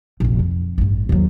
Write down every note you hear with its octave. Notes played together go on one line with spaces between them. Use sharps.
F1 A#1
F2
A1 G2
D#2 F#3